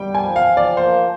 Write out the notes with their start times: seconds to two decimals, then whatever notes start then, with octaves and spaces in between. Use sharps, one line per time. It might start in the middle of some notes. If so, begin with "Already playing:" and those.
Already playing: G3 G5
0.15 F3 G#5
0.36 F5
0.45 F3
0.57 D5
0.77 A#3 C5